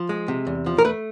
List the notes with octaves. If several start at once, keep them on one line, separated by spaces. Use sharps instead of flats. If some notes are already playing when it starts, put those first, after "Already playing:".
Already playing: F3
G#3
C3
E2
F3
A#4
A3 B4